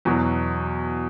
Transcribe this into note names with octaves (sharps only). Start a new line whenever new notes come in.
E2 B2 F#3